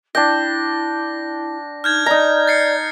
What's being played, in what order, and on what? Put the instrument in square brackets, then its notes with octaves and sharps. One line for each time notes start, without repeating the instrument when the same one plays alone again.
[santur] D4 G5 [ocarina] E4 [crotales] A#6
[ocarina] D#4 [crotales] F6 G6 G#6
[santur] D#4 A#5 [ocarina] D5
[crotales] A6 C7 C#7